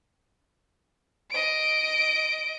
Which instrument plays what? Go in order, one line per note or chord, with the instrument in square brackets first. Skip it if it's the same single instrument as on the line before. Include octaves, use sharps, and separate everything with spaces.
[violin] D#5 D7